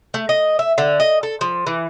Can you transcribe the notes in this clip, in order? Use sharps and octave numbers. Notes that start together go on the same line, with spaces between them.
A3
D#5
E5
D3
D#5
A4
F3
E3